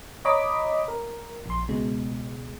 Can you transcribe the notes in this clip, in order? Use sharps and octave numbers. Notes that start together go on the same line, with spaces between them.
C#5 D#5 A#5 B5 D6 B6
A#4
A#1 C6
C#2 B2 G#3